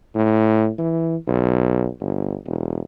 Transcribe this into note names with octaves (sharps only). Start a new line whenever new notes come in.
A2
E3
B1
G1
E1